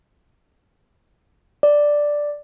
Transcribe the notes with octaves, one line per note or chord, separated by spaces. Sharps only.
D5